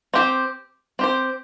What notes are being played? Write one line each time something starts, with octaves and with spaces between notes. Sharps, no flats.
C4 G4 C5
C4 G4 C5